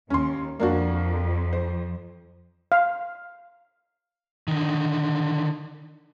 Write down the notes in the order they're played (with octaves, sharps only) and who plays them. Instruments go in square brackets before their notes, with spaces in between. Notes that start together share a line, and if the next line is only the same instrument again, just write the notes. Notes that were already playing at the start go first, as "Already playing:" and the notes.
[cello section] D#2 [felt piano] C#4 C6
[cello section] F2 [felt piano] A#3 D4 F#4
[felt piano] C5
[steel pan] F5
[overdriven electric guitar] D3 D#3